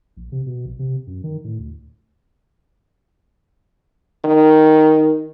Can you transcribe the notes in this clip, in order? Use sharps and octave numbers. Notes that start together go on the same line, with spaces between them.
A#1
C3
B2
A#1
C3
F#2
D#3
A2
D2
D#3